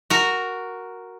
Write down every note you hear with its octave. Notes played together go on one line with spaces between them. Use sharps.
F#4 A#4